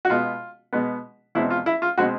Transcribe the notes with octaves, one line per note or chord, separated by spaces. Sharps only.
F#4
B2 G#3 B3 F4
B2 G#3 B3
E2 B2 G#3 C4 E4
F4
E4
F4
B2 G#3 C4 F#4